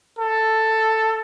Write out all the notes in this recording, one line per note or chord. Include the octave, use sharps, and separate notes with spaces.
A4